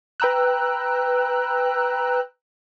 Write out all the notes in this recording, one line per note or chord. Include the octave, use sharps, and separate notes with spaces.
B4 G5 A#5 E6 F#6